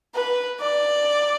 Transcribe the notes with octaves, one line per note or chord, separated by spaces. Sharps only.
B4
D5